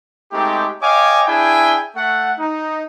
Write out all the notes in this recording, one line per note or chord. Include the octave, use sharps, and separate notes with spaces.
G#3 A3 C4 D#4 G4
C#5 D#5 F5 G5 G#5 D6
D4 E4 G#4 E5 G5 G#5
A3 F#5
D#4